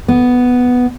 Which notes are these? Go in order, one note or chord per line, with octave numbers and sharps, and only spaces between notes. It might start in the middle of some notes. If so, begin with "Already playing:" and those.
B3